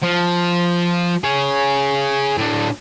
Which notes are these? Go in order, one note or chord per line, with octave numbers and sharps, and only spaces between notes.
F3
G#4 C#5
A2 D4